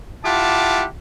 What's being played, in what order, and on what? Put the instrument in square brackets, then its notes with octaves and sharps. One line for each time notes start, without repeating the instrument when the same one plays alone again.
[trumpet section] E4 F4 G4 F#5 A5 D6